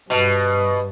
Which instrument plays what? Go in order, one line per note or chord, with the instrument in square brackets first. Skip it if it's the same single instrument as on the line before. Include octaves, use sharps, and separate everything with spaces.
[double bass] G2 [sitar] B2 [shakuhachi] B4